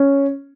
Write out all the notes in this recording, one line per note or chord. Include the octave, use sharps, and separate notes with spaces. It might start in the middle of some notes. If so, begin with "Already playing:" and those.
Already playing: C#4